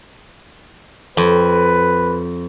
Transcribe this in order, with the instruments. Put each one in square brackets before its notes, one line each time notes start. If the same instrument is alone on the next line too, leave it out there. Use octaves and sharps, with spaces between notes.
[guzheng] F2 [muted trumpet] B4